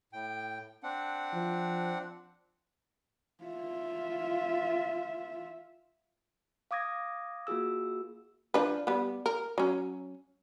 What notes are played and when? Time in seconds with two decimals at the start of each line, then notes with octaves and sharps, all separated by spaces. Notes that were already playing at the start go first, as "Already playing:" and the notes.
0.13 A2 G5
0.83 C4 D4 F#5
1.33 F3
3.44 F4 E5
6.71 F5 D6 D#6 G#6 A#6
7.47 A#3 F4 F#4 G#4 E6
8.54 F3 D4 B4
8.87 G3 B3
9.26 A#4
9.58 F#3 C#4